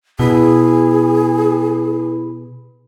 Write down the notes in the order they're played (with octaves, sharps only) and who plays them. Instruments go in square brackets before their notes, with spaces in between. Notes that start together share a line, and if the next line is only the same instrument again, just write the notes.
[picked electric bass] B2 [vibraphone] E4 B4 B5 [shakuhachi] G#4